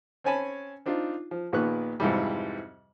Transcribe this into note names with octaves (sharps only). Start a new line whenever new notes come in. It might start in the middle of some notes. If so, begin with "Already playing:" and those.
C4 C#4 C#5 G#5 A5 B5
C4 D4 D#4 F4
F3
A#1 A#2 D#3 B3 C#6 F#6
F2 G#2 C3 E3 G3